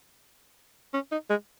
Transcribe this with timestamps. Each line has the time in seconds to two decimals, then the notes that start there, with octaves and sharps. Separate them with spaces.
0.94 C#4
1.12 D#4
1.30 G#3